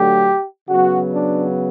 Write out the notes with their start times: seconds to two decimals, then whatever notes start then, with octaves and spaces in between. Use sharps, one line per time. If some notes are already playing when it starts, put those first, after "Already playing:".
Already playing: D3 F#3 A3 G4
0.69 C#3 F#3 B3 F#4
1.13 D4